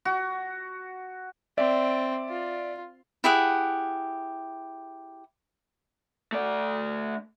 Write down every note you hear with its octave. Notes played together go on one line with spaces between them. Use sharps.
F#4
C4 D5 E5
F4
E4 G4 G#4 F#5
A3 D5